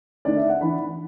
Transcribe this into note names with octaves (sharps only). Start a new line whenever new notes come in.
D3 A3 D4 D5
E5
F#5
E3 D4 B5